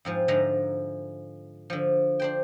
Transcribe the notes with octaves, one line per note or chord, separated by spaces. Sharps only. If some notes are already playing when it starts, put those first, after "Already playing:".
F2 G#2 F3
G#2 D3 F3 G#3 E5 A#5
D3 F3
D4 C5 G5